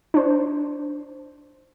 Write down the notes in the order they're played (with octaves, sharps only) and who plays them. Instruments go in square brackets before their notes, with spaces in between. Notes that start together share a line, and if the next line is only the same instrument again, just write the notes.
[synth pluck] D4 C5